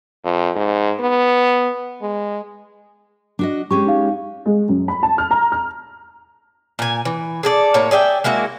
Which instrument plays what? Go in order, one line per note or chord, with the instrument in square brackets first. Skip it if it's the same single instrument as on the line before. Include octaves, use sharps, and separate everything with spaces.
[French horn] F2
G#2
B3
G#3
[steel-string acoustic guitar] D4 F#4 D#5
[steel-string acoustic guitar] G#3 C#4 G4 [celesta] C#6
[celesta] D#4 F5
[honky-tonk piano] G#3
F#2
B5
A5
F6
A#5
F6
[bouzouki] A#2 G#5
E3
G#4 A4 D5
A2 A#3 C#5
G#4 D5 E5 G5
G#3 A#3 E4 F#4